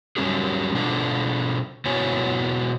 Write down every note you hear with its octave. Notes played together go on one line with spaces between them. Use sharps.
F#3 G3 C#4 G4 G#4
B2 D4 F4 A4
B2 B3 E4 F#4 C#5 G#5